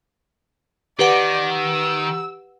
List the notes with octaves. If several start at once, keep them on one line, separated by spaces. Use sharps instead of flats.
D#3 G4 B4 D5 F#5
E6